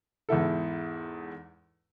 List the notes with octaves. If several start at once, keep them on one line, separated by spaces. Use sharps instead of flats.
E2 G#2 E4 A4